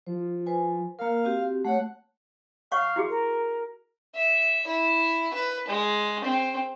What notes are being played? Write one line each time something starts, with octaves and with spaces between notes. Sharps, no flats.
F3 C5
B4 C5 G#5
A#3 A#4 F5
C4 F#4 G4
A3 C#5 F#5
C#5 F5 F#5 C#6
E4 F#4 G#4
A#4
E5
E4
B4
G#3
C4